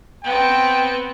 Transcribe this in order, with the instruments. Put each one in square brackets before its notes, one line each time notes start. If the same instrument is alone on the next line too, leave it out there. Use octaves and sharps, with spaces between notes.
[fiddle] B3 C4 [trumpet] G5